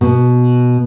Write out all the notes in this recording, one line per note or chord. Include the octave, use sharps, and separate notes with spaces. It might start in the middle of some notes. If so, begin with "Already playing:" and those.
B2